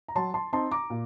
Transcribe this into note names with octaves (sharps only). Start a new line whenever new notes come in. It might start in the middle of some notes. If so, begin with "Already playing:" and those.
A#5
F#3 A5 C6
A5 C6
C4 D#4 A5 C6
A#5 D6
A#2